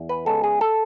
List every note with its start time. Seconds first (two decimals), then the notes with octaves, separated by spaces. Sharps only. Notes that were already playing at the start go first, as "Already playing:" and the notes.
Already playing: E2
0.09 B4
0.26 C#3 G#3 B3 A4
0.44 G#4
0.61 A4